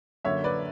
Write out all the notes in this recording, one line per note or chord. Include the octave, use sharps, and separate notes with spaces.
F#2 D3 A#3 C#5 E5
B4 D5